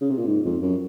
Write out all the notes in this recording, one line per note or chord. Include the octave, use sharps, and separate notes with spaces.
C#3
C3
A#2
G#2
F2
F#2